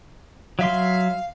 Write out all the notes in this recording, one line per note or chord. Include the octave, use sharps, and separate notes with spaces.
F#3 E5 F5 C6